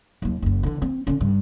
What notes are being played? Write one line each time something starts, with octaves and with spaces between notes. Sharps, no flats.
D#2 F#3
F#1 F#2
D3 E3
C4
D3 C#4
G2